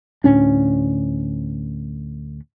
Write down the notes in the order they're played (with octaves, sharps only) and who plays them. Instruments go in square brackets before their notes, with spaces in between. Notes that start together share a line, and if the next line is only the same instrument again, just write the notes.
[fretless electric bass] D2 A2 C#4 D4